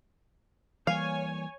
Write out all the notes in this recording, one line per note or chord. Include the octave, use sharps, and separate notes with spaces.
E3 G3 A#3 C#5 F5 G#5